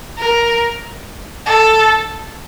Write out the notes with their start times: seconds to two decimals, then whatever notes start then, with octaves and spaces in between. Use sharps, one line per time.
0.18 A#4
1.46 A4